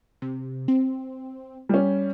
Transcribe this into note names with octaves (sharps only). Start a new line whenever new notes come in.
C3
C4
G3 C#4